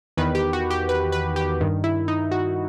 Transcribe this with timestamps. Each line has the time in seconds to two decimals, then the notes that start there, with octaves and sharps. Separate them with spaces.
0.17 E2 D#3 B4
0.35 G4
0.53 F#4
0.70 G4
0.89 B4
1.12 B4
1.36 G4
1.61 G2 D#3
1.84 E4
2.08 D#4
2.31 F#4